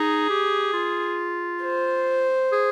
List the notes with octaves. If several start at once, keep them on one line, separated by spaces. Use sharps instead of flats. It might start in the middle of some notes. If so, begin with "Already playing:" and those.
Already playing: D#4 G#4
G4
F4
C5
G#4